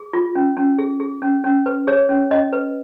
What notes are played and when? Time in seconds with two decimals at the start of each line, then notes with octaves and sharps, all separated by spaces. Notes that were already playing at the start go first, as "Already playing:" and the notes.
Already playing: G#4
0.13 F4
0.35 C#4
0.57 C#4
0.78 G#4
1.00 G#4
1.22 C#4
1.44 C#4
1.66 B4
1.87 G#4 C#5
2.09 C#4
2.31 C#4 D#5
2.53 B4